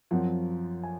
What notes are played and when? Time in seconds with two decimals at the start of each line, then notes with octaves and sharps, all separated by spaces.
0.11 F#2 F3 C4 F#5
0.83 G#5